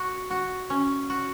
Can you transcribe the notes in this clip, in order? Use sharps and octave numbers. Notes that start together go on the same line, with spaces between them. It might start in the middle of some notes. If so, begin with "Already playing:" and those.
Already playing: F#4
F#4
C#4
F#4